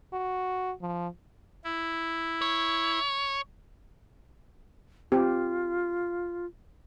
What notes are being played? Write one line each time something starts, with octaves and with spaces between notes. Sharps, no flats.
F#4
F3
E4
C#5
C4 F4 G4